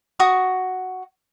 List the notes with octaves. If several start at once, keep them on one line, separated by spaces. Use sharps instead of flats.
F#4 C#6 D#6